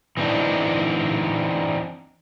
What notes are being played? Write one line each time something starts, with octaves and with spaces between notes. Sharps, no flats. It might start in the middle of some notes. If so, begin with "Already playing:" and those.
E3 C4 D4 D#4